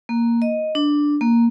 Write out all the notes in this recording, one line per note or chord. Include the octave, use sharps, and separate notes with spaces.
A#3
D#5
D4
A#3